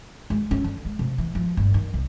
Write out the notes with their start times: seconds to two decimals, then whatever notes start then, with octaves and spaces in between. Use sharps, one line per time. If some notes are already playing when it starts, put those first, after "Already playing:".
0.30 G#3
0.51 C#4
0.64 D3
0.85 G#3
0.99 C3
1.18 E3
1.35 F3
1.57 G1
1.74 D#3
1.94 C2